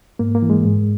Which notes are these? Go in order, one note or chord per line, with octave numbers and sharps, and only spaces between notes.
G#2 A#3
A#3
E3
G#3
G#2